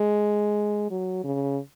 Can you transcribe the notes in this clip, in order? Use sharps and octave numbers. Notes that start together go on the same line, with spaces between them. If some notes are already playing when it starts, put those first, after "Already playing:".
Already playing: G#3
F#3
C#3